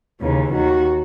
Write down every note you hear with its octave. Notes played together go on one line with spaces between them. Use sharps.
D#2 C#3 E3
D#2 D#3 F#4